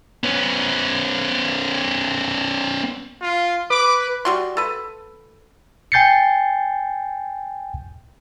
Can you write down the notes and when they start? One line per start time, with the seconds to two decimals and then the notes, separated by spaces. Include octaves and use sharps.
0.24 B3 C#4
3.21 F4
3.70 B4 D6
4.25 G3 F#4 C6
4.57 A4 B4
5.92 G5 G#5 G6 A6 C7 C#7